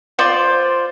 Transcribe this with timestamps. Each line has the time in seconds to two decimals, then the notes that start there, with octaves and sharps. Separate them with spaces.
0.19 F4 C5 D5